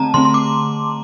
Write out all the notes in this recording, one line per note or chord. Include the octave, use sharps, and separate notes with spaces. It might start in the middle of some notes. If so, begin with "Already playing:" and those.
Already playing: D3 A3 C4 A5 A#5
D3 A3 C4 C6
C6
D6